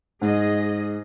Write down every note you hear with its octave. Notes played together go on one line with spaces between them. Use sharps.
G#2 G#4 D#5